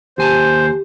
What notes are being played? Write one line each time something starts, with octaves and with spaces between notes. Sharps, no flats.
D#2 G4 C5 G#5 A5